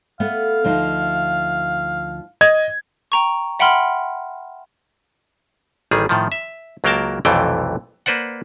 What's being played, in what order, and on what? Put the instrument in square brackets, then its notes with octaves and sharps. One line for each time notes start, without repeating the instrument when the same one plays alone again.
[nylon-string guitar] A3 B3 [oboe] F5
[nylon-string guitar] D2 F3 D#4
[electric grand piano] D#5 G#6
[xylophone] G5 A#5 C#6
E5 F#5 G5 B5 C6 F6
[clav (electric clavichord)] A1 D#3 G3 G#4
A2 D#3 F3
E5
C#2 F#3 A#3 A#4 G5 A5
B1 F2 C3 E3 A3 G5
A#3 B4 C5 D5 F#5